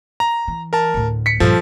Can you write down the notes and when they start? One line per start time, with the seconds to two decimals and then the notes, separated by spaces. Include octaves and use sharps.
0.20 A#5
0.48 E3
0.73 A#4 A5
0.94 D2 A2
1.26 B6 C#7
1.40 G2 A#2 F3 A4